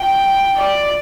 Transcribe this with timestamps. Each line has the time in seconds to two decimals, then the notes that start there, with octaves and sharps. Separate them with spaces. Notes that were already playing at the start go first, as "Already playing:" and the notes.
Already playing: G5
0.57 D5